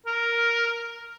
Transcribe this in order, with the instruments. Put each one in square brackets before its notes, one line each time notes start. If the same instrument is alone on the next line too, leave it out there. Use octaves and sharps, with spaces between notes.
[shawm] A#4